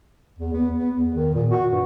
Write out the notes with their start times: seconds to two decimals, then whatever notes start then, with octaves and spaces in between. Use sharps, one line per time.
0.39 E2
0.53 B3
0.78 B3
0.96 E2
1.15 D#3
1.35 A#2
1.50 F#4
1.72 G2